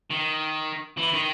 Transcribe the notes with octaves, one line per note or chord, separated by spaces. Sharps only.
D#3
E3
D#3